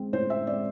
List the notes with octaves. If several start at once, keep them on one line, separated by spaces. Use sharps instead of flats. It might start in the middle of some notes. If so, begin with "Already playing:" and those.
Already playing: G#3 C4
A2 C5
E5
G#3 C4 D5